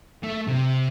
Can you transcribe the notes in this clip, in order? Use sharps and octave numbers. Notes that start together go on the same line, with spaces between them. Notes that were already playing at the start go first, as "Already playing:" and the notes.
A3
C3